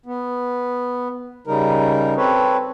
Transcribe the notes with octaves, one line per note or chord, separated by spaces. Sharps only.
B3
C#3 G3 D#4 A#4
C4 A4 B4 C#5